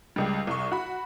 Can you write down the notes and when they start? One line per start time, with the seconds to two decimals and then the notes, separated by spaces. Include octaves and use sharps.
0.16 C#2 G3
0.47 C2 C#6
0.72 F#4 B5